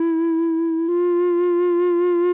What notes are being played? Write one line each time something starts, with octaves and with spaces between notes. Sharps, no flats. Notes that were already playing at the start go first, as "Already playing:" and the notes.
Already playing: E4
F4